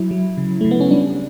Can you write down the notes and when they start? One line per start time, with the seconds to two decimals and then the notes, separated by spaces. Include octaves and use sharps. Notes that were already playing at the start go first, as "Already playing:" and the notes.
Already playing: F#3 E4
0.11 F#3
0.37 C#3
0.61 C#3 A3
0.71 B3
0.81 C#4
0.91 G3 D4